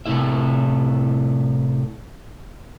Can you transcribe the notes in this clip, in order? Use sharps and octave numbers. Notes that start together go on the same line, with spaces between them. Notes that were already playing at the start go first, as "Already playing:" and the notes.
A2 C3 A3 E4 E5